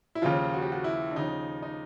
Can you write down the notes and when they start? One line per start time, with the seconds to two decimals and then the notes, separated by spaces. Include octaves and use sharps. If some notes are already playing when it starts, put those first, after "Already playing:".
0.15 E4
0.22 D#2 C#3 F3 F4
0.54 F#4
0.62 G4
0.72 F#4
0.84 E4
1.11 D4
1.16 D#2 C#3 F3 D#4
1.62 D#4